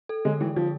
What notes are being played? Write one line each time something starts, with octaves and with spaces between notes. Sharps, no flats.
A4
D3 G#3
E3 G#3
D3 F3